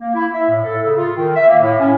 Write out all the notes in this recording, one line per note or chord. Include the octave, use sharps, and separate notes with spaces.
A#3
E4
E5
A2
A4
C#3
F4
D#3
E5
A#3
A2
C#4